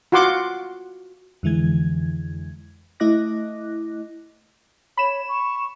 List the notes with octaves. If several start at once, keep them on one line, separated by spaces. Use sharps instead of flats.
F4 F#4 F#5 C6 D6
F2 D3 E3 G#3 G#6
A3 E4 D#5 D6 F#6 A#6
C#5 B5 E7
C#6